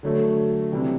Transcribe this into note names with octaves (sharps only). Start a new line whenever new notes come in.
D3 F#3 A3
C3 E3 G3